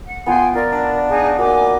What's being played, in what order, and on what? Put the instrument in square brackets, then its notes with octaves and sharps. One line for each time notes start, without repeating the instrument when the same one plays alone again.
[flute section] F#5
[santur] B3 F4 B4 [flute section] G5 G#5 C6
[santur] F4 [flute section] A#4 D5
[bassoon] D4
[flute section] D#4 G#4
[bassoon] A#2 [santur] D#4 F#4 [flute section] D#5 G#5 D6